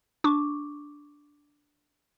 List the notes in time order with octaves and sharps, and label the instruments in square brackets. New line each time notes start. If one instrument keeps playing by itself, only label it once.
[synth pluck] D4 C#6 D6